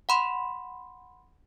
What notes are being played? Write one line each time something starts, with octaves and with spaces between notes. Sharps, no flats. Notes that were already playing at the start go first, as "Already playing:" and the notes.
F#5 B5 C6